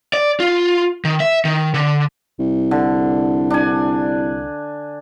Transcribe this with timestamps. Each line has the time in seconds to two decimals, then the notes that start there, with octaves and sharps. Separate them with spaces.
0.13 D5
0.40 F4
1.05 D#3
1.20 E5
1.45 D#3
1.74 D3
2.39 C2
2.71 D3
3.50 D4 G#5